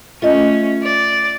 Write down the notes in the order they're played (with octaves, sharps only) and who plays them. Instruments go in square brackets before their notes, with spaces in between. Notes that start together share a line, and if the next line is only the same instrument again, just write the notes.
[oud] A3 [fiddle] C#4 [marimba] F4 D#5
[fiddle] D5